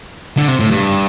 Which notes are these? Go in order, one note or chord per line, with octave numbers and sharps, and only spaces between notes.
D3
C3
A2
G2